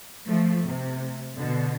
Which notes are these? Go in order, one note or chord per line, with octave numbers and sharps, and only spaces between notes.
F3 A3
C3
B2 D3